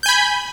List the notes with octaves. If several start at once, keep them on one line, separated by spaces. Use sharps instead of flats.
G#5 B5 G6